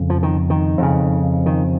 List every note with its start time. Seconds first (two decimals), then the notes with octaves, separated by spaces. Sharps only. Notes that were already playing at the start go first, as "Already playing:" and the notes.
Already playing: F2 C#3
0.10 F3
0.23 D#3
0.50 D#3
0.78 F2 C#3
1.46 D#3